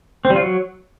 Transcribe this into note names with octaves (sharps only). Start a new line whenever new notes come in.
C4
G3
F4
F#3